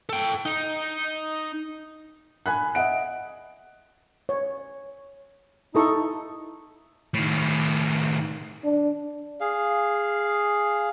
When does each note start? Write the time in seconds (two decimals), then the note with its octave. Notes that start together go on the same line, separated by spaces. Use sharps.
0.09 A4 G5
0.46 D#4
2.46 G#5 B5 F#6
2.75 D#5 E5 F#5 D7
4.29 C#5
5.75 D#4 E4 A4 C#6
7.14 A2 D#3
8.64 D4
9.41 G#4 F5